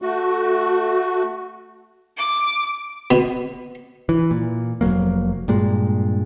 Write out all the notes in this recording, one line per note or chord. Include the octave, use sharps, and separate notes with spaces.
A3 F#4
D6
B2
E3
A#2
F1 E2 F#3 A#3
G2 A#2 G#3